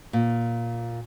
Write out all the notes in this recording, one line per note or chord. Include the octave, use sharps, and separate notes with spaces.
A#2